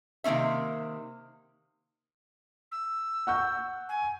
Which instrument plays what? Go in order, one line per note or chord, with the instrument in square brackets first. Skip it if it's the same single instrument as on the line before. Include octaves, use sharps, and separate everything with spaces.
[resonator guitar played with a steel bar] C3 D#3 A#3 C#4 E5
[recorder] E6
[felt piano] F#5 C#6 G6
[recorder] G#5